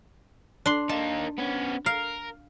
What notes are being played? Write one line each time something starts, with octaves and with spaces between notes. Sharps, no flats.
D4 C6
A#3 D#4 A5
B3 C#4
A#4 F5